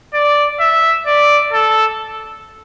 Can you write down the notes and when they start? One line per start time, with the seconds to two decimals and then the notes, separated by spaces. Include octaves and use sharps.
0.14 D5
0.60 E5
1.06 D5
1.53 A4